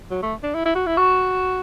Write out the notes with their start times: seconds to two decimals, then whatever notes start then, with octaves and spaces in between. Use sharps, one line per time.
0.11 F#3
0.23 A3
0.43 D4
0.55 E4
0.65 E4
0.75 F#4
0.87 E4
0.97 F#4 C#6